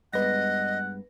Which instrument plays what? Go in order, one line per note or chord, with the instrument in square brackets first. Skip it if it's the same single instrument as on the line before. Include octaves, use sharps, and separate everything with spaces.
[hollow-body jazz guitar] G2 G#3 B3 [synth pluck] B4 A#6 [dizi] D#5 [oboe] F#5